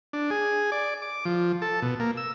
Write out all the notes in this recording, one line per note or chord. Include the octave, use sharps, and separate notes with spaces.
D4
G#4
D5
D6
F3
A4
B2
A#3
E6